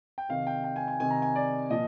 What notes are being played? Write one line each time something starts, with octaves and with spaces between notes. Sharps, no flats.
G5
C3 D#3 F5
G5
G5
G#5
G#5
C3 D#3 G#5
A#5
G#5
D5
A#2 F3 D#5